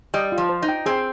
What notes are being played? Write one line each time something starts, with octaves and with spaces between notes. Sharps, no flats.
G3 D#5
F4
F3
C5
D#4
G5
C4 G#4